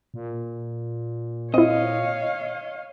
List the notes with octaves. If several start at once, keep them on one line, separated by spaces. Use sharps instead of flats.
A#2
C4 E4 C#5 D#5 F5